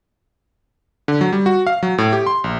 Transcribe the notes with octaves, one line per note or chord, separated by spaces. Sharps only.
D3
F#3
G3
F#4
F5
F#3
A2
G4
C6
A#1